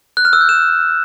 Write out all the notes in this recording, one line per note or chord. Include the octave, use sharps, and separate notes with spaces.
F#6
F6
E6
G6
E7